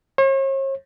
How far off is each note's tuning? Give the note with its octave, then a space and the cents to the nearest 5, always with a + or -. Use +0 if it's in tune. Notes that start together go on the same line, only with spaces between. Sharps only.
C#5 -45